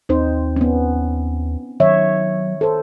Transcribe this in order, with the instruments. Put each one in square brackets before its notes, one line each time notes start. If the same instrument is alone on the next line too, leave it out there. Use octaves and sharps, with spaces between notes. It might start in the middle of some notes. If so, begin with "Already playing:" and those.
[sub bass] D#2 [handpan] C4 D#4 C5
[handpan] B3 C#4
[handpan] D#3 C#5 E5 [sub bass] F#3
[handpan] A4 C5